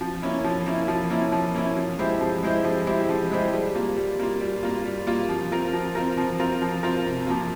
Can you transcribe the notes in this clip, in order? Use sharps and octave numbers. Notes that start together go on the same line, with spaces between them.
F3
A#3 C#4 E4
F3
A#3 C#4 E4
F3
A#3 C#4 E4
F3
A#3 C#4 E4
F3
G#3 E4 G4 C5
F3
G#3 E4 G4 C5
F3
G#3 E4 G4 C5
F3
G#3 E4 G4 C5
G3
A#3 F4
G3
A#3 F4
G3
A#3 F4
G3
A#3 F4
F3
C4 F4 A#4
F3
C4 F4 A#4
F3
C4 F4 A#4
F3
C4 F4 A#4
C3
F3 A#3 F4